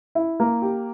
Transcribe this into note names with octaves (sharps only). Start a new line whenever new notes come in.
E4
A#3
G4